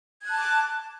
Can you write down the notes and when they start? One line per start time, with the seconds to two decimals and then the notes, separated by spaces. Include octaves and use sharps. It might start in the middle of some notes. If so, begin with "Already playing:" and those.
0.21 G#6
0.26 F#6
0.31 A5
0.36 D6